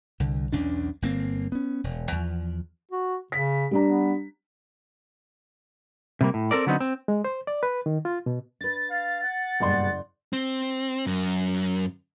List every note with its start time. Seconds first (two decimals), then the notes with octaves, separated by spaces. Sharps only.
0.20 C2 D3
0.52 B1 E2 C#4 D4
1.02 G1 A#3 C4
1.52 B3 C#4
1.84 E1
2.12 E2 F3
2.91 F#4
3.32 C#3 B6
3.71 G3 D4 A#5
3.86 B3
6.21 C3 G3 A#3
6.34 A2
6.51 C4 A4 A#4 D5
6.66 D3 F#3 B3 C4 D#4
6.80 C4
7.08 G#3
7.25 C5
7.47 D5
7.63 B4
7.86 D#3
8.05 F4
8.26 B2
8.61 D4 B4 A6
8.90 F5
9.24 F#5
9.60 F#1 G2 B2 G#3 D5 C6
10.33 C4
11.07 F#2